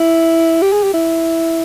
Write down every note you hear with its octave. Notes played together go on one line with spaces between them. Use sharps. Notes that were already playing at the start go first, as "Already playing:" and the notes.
Already playing: E4
G4
G#4
G4
E4